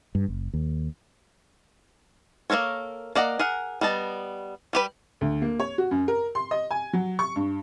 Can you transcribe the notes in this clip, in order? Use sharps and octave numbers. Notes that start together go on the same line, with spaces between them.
G2
F#1
D#2
A#3 C4 A4 A#4 C#5
A#3 D5 D#5 F#5 A#5
G#4 A#4 F#5
G3 B3 D#5 A5
G3 G4 B4
D2
A#3
C#5
F#4
F#2
A#4
C6
D#5
G#5
F#3
C#6
G2